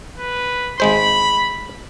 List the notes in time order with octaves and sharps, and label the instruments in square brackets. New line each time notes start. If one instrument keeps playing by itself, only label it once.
[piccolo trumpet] B4
[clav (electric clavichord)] G#1 G#3 C5 [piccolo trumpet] B5